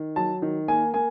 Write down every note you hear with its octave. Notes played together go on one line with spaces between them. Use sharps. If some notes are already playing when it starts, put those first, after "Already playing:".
Already playing: D#3
F#3 A5
D#3
A#3 G#5
A#3 G#5